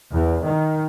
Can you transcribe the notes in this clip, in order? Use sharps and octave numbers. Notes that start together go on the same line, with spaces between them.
E2
D#3